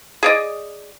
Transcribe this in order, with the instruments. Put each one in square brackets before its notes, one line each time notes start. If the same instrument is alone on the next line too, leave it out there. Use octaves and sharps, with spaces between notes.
[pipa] G#4 D5 D#5